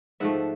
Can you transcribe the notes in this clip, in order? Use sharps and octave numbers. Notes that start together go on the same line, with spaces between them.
G#2 F3 A3 E5 F#5